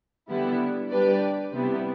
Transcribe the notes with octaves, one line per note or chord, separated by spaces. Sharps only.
D3 G3 B3 E4
G3 D4 G4 B4 D5
C3 G3 B3 E4